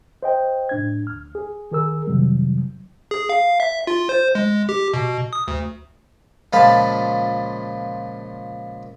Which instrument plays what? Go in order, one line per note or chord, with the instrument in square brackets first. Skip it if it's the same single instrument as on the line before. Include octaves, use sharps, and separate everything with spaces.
[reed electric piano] C5 D#5 G5
A2 D4 G#6
D2 F6
G#4
D#3 G#4 A#4 E6
F2 C3 D#3 F#3 G3
[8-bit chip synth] G#4
F5
E5
F4
C5
G#3
G4
B2
D#6
D2
[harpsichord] C#2 A#2 F3 F5 A5 B5